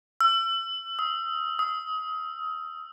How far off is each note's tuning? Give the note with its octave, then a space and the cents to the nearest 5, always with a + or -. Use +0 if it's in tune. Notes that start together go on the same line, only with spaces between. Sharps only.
E6 +35
D#6 +35
D#6 +30